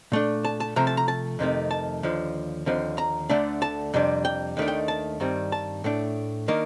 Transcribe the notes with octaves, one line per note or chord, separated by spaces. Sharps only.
A#2 A3 D4
A5
A5
C3 F3 A3 A#5
A5
A#5
A5
F2 C3 D#3 A3
A5
D#2 D3 F3
D#2 D3 F3 C4
A#5
D2 D3 A3 D4
A5
F2 C3 G3 D4
G5
D#2 D#3 A3 D4
G5
A5
G2 D#3 G3 C4
A5
A2 A3 D4
D#3 A#3 D4